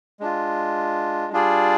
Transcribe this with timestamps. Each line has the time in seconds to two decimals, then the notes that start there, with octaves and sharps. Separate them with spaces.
0.20 G#3 D4 F4
1.33 G3 D4 F4 G#4 D5